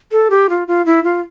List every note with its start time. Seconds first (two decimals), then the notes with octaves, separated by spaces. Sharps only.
0.12 A4
0.30 G4
0.50 F4
0.68 F4
0.86 E4
1.04 F4